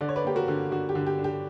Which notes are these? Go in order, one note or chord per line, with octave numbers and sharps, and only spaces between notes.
D3 D5
C#5
B4 D5
A#3 G4
F#4 A#4
D3
D3 F#4
G4
D3
G4
D4
G4